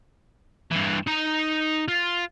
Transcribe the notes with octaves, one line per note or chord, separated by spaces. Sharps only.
G2 E3
D#4 A#5
F4